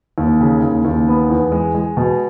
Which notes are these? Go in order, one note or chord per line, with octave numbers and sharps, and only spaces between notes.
D#2
C#3
D#2
D#2
B3
E2
G#3
G#3
B2